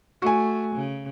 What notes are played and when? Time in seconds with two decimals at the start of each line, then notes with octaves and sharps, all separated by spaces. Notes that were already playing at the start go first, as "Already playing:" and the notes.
0.22 A3 F#4 G#5
0.75 C#3